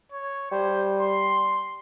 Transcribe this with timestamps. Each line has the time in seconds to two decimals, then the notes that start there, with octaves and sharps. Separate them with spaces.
0.12 C#5
0.52 G3 C5
1.00 C6